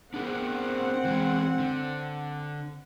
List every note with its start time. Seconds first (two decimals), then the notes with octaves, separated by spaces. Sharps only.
0.14 C4 D4 G#4 A#4 F#5
1.05 E3 G#3
1.59 D3